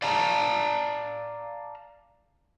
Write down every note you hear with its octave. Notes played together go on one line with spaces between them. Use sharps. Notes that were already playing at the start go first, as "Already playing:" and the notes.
D5 F5 A5 A#5